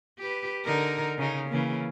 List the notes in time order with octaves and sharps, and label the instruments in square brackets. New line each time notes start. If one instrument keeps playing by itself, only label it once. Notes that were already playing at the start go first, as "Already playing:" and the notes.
[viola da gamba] G4 B4
D3 D#4 A#4
C#3 D#4
C#3 E3 A#3